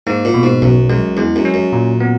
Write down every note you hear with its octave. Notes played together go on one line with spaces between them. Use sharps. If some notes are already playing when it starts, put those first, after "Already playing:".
G#2 A#3
A#2
B2
G#2
B1 F#2
F#2 G#3
E2 G#3
F#2
C#4
F#2
A#2
B3